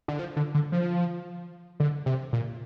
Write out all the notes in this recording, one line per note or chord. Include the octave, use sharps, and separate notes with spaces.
D3
F3
D3
D3
F3
D3
C3
A#2